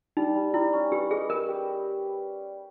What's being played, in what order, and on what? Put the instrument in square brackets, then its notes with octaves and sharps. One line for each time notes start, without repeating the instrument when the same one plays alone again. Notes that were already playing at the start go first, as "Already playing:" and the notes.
[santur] G3 [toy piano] D#4
[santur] G3
[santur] G3 [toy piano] E4
[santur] C#4
[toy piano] G4 [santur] B4
[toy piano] G#4 [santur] D#5
[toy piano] A#4 [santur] B4
[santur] G4